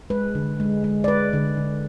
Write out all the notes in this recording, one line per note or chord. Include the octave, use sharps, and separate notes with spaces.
G#3 B4
D3
G#3
G#3
D5
G#3 B4
D3
D3